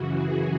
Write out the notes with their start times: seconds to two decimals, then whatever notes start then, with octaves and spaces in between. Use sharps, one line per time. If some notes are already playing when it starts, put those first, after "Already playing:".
Already playing: F#2 C#3 E3 F#4
0.12 G#4